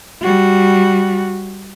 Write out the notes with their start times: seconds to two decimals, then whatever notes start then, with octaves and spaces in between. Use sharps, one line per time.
0.22 G3 F#4